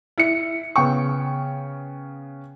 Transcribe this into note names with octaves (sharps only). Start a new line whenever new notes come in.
E4 C#7
C#3 B3 G5 C#6